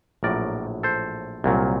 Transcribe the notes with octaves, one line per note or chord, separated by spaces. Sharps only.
A#1 A2 F#3 A#4 D5
A4 C5
C2 A#2 F#3